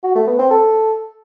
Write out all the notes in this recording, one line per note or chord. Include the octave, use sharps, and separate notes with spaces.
F#4
A3
B3
C4
A4